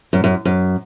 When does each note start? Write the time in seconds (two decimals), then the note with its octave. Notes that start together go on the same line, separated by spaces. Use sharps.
0.13 F#2
0.24 F#2
0.45 F#2